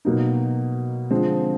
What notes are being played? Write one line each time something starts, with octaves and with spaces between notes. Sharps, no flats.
B2 F#3 A#3 D#4
D3 F3 G#3 C4